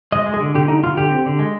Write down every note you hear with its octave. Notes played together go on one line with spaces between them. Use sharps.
G#3 D#5
G#3
G#4
D3
D3 G4
D3 D#4
D3 F4
D3 G4
C4
D3
G#3